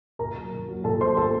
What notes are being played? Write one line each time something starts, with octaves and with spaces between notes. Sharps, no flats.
A#2 A#4 A#5
F#3
A#2
F#3
A#2 A4 A5
F#3 C5 C6
A#2 A4 A5